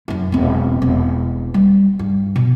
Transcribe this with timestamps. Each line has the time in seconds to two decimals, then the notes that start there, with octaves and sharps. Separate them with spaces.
0.08 F#2 E4
0.32 E1 C4
0.82 E1
1.54 G3
1.99 G2
2.36 B2